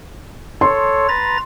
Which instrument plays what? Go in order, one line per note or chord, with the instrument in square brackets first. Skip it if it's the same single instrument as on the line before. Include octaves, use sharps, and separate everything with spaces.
[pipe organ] A4 C#5 [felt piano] C6
[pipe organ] B4 A#5 A6